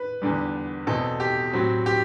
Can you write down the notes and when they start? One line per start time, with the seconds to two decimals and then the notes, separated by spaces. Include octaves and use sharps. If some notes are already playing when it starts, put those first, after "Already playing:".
Already playing: B4
0.22 E2 D3 G3
0.87 E2 B2 A3 C4 A4
1.20 G4
1.53 A2 F#3 C4
1.86 G4